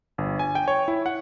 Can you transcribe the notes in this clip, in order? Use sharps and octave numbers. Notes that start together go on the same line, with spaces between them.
G1
G#5
G5
C#5
E4
F#5